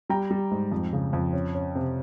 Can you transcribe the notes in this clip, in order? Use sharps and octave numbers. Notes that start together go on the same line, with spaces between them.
G3 G5 A#5
G3
G#2
F2
C#3
F2
C#4
C#4
C3